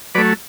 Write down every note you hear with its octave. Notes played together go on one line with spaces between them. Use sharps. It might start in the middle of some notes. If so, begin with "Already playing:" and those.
F#3 A3 B4 D5